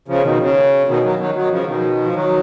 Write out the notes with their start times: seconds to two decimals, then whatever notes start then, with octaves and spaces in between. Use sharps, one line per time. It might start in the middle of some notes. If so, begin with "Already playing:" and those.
0.08 C#3 F3
0.23 B2 D#3
0.40 C#3
0.88 B2 D#3
1.03 D#3 F#3
1.19 D#3 F#3
1.35 D#3 F#3
1.50 C#3 F3
1.66 B2 D#3
2.04 F3
2.14 D#3 F#3